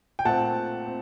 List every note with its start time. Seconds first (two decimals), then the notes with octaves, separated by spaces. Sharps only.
0.19 G5
0.25 A#2 A3 C4 F#5 A5
0.86 C4